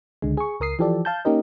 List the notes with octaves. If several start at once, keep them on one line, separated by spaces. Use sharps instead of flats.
C#2 D3 G#3
G#4 C#6
C#2 A#4 D#6 C7
E3 F3 G4 A4 D5
F5 A5 G6
A#3 C#4 D#4 G4 A#4 D#5